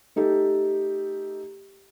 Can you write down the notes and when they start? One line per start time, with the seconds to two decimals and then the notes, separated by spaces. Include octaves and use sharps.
0.16 A3 D#4 G4 A4